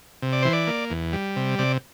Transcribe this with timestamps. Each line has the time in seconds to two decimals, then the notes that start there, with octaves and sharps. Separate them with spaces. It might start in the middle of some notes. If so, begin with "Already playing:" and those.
0.22 C3
0.33 D5
0.43 E3 C5
0.53 D5
0.67 A#3
0.90 E2
1.13 G3
1.36 C3
1.59 C3 D5